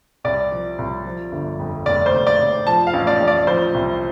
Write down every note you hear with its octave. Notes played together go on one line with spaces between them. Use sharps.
C2 D5
F3
C2
F3
G1
F2
F1 D5
C5
F1
D5
F1
F3 A5
F5
A1
D5
A1
D5
F3 C5
C2